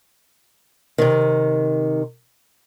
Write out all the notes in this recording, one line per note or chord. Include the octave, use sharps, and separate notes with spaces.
C3 D#3